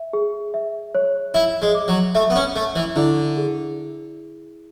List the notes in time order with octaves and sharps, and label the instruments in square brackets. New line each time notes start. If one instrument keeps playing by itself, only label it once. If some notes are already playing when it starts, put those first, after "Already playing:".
Already playing: [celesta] E5
G#4
E5
C#5
[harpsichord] E4 [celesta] E5
[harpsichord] G#3
[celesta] D6
[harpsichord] F#3
[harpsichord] A3 [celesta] E5
[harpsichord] B3
C#4
[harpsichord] A3 [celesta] E5
[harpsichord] E3
[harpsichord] D3 [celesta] E4
[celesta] G#4